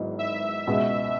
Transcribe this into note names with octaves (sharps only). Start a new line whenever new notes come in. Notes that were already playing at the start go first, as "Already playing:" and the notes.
Already playing: G#1 G#2 F#3 B3 E4
E5
C#2 B2 G#3 B3